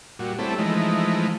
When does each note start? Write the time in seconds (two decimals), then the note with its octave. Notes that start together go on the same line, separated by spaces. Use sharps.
0.19 A#2 G3 F#4
0.39 G3 A3 C4 C#4 E4 A4
0.58 E3 F3 G#3 A3 D#4